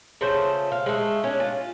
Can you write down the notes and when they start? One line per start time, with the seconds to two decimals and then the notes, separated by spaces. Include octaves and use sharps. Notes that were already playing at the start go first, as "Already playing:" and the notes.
0.21 C#3 F3 A3 C5
0.72 F5
0.86 G#3 A3
1.24 C#4 D4
1.40 F4